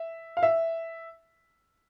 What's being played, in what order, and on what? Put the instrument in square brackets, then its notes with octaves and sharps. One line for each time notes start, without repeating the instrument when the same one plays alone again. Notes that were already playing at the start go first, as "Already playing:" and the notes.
Already playing: [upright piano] E5
F5
E5